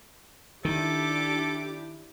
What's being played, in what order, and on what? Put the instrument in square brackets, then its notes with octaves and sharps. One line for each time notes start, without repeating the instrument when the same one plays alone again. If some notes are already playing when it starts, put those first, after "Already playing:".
[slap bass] D#3 [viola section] D4 E4 G4 [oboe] A4 [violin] D6